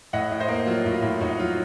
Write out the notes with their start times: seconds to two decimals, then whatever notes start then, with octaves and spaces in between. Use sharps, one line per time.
0.13 A2 D#5 F#5
0.31 A2
0.40 C5 D#5
0.48 A#3
0.66 F#3 F4
0.86 A2
0.94 F4
1.02 A2
1.20 A2 D#4 F#4
1.40 F#3 F4